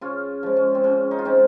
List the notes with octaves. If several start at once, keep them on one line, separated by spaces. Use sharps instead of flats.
C#3 C#4 F4
F3 G#3
C#4
C4
C#3 C#4
D#4
F4
F3 G#3 C4 D#4